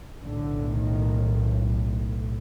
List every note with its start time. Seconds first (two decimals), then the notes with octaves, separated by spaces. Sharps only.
0.24 B1 A2 D3
0.76 D#3